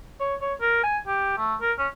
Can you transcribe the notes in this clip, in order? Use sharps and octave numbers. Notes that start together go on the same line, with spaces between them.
C#5
C#5
A#4
G#5
G4
A3
A#4
C#4